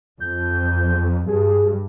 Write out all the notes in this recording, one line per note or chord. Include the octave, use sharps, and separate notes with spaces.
F2 G6
G2 G#4